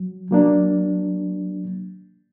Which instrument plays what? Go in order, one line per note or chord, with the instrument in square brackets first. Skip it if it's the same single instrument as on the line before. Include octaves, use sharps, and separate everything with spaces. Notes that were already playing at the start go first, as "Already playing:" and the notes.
Already playing: [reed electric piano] F#3
F#3 A#3 D4